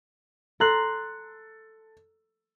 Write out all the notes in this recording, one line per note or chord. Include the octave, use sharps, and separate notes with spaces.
A4 A#5 C6 F#6